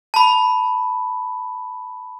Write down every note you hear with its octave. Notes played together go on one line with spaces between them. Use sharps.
A5 B5